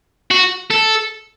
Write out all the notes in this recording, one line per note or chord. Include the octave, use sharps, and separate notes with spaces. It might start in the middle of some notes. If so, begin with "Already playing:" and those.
F#4
A4